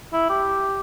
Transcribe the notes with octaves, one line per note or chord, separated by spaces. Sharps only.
E4
G4